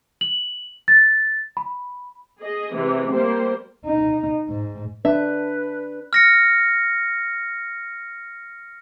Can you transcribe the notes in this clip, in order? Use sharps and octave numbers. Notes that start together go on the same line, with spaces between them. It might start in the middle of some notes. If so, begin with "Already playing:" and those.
F#7
A6
B5
G#4 D#5
C3 E3 G#3
G3 A#3 C5
D#4
G#2
D4 B4 E5
F6 A#6 C#7